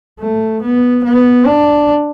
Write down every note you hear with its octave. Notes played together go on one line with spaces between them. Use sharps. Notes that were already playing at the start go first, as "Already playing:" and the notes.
A3
B3
B3
D4